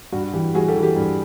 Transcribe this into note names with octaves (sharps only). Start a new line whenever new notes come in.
G2 F#4
E3 G4
G3 F#4 G#4
G4 A4
E3
G4
G2